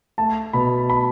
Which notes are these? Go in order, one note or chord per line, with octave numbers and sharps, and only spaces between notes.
A3 A5
B2 B5
B5